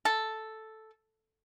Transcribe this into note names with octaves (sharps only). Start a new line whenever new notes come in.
A4